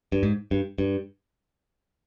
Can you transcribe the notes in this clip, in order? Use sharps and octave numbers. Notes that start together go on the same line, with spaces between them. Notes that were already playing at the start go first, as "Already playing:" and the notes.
G2
G#2
G2
G2